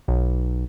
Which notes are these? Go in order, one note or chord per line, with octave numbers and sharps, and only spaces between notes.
B1